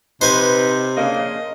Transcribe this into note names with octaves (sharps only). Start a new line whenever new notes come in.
C3 D#4 B4 C5 G#5
C#3 A#3 D4 D#5